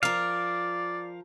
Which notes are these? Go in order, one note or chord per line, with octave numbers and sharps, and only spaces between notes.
F3 A#4 D5 F5